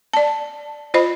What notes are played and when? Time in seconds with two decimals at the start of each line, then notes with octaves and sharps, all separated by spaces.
0.14 D5 A5
0.94 F4 C5 D#5 B5